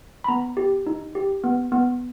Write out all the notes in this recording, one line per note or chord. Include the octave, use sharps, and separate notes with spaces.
B5
B3 A#5
G4
D#4
G4
B3
B3